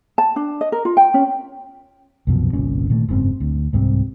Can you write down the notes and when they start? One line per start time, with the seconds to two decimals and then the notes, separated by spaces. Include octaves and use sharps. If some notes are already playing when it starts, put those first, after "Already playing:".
0.18 A5
0.36 D4
0.61 D#5
0.72 A#4
0.85 F4
0.97 G5
1.14 C#4
2.27 C2 F#2 B2 F3
2.53 G1 C2 A#2 C#4
2.90 A#2 D#3 A3
3.08 F#1 G#2 C#3 C4
3.40 D2
3.73 C2 G#2 C3 G3